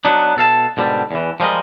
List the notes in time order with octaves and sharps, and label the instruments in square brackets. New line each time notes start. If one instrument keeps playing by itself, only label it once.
[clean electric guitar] F#3 B3 D4 D#4
B2 A4 F5 A5
G#2 B2 D3 G3
E2 E3
F3 G3 G#3 A#4 D#5